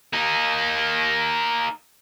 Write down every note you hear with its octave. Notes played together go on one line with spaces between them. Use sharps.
A#3 D#4